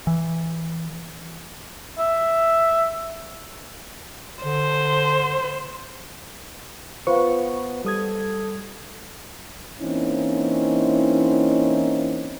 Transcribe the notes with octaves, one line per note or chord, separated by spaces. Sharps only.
E3
E5
D3 C5
B3 F4 B4 C5 F5 C#6
G3 A4 D#6 G#6
E3 A#3 C4 C#4 D#4 E4